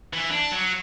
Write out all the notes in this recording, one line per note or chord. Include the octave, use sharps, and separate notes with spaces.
E3
D4
F#3